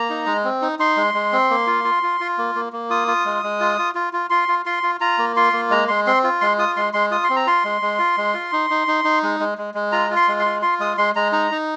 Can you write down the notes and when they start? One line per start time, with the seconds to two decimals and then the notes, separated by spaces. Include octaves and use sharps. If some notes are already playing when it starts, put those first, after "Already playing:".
Already playing: A#3 A#5
0.10 D#4
0.26 G#3
0.45 C4
0.62 D#4
0.79 D#4 C6
0.97 G#3
1.14 G#3
1.32 C4
1.50 A#3
1.67 F4
1.84 F4
2.03 F4
2.21 F4
2.38 A#3
2.55 A#3
2.73 A#3
2.90 F4 D#6
3.08 F4
3.25 G#3
3.43 G#3
3.60 F4
3.78 F4
3.95 F4
4.13 F4
4.30 F4 C6
4.48 F4
4.66 F4 C6
4.83 F4
5.01 F4 A#5
5.18 A#3
5.36 F4 C6
5.53 A#3
5.70 G#3 A#5
5.88 G#3 C6
6.07 C4 C6
6.24 F4
6.41 G#3 C6
6.58 F4 D#6
6.77 G#3 C6
6.93 G#3 C6
7.11 F4 D#6
7.24 C6
7.30 C4
7.36 A#5
7.46 F4 C6
7.64 G#3
7.82 G#3
7.99 F4
8.17 G#3
8.34 F4
8.52 D#4
8.70 D#4
8.88 D#4
9.04 D#4
9.23 G#3
9.40 G#3
9.58 G#3
9.74 G#3
9.92 F4 A#5
10.11 F4
10.16 C6
10.28 G#3
10.39 C6
10.46 F4
10.62 F4 C6
10.80 G#3 D#6
10.98 G#3 C6
11.16 G#3 A#5
11.32 D#4 A#5
11.51 D#4